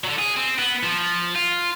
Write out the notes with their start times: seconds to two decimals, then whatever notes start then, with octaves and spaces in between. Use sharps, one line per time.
0.04 D3 F#3
0.19 G#4
0.36 C4
0.59 B3
0.83 F3
1.35 F4